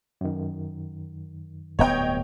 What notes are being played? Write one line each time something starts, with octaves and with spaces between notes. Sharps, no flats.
F#2 D#3
D1 G2 B3 C#5 D#5 G5